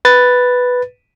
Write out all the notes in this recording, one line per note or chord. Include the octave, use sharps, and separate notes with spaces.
B4 A6